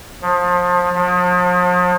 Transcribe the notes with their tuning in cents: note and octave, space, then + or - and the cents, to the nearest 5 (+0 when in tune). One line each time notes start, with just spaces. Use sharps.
F3 +30
F3 +45